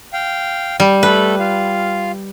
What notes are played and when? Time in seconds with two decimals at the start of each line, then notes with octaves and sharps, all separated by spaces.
0.13 F5 G5
0.80 G3
1.03 A3 A4 B4
1.39 F4 F5